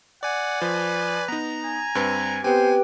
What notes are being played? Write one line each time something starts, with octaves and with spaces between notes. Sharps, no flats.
D5 F#5 G#5
F3 B4
B3 D#4 A#5
G#5
G2 C4 B4
B3 C4 G4 B4 C5 G5 G#5